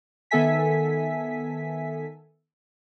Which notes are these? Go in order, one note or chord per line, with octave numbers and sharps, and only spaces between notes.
D#3 B3 A4 E5 G#5 B6